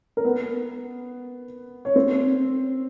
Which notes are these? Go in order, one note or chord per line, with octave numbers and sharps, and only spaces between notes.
A#4
B3 B4
C#5
C4 C5